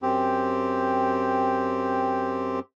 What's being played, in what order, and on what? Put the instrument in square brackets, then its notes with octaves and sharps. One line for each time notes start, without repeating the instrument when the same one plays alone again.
[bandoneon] F#2 C4 G4